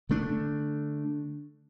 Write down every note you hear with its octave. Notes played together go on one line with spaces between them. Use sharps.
D3 A3 D4